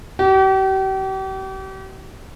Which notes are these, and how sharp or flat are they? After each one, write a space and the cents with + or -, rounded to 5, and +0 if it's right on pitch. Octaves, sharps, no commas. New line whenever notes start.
G4 -40